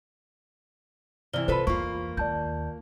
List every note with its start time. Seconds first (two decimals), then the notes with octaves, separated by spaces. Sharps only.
1.33 C3 E3 D5 F6 G7
1.48 C3 F4 A4 B4 C5 B5
1.67 E2 A#3 F4 C#6
2.17 D#2 D5 A5 G6